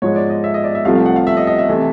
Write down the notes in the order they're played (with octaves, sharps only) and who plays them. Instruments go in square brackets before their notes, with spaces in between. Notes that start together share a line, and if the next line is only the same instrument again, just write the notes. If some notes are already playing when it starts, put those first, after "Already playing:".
[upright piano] G#2 F3 G#3 C#5
D5
D#5
E5
D#5
D5
E5
C2 C3 F3 A3 F5
F5
F#5
F5
E5
D#5
D#5
E5
C3 E3 A3